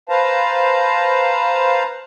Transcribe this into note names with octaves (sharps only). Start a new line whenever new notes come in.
B4 C5 F5 A5 A#5